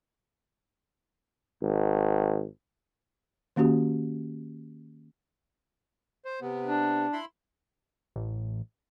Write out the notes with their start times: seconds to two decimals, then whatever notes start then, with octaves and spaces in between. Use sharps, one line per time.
1.62 G#1
3.56 D#3 A#3 C#4 F#4 G4
6.25 C5
6.41 C3 B3
6.66 D4
7.13 E4 B5 C6
8.16 A1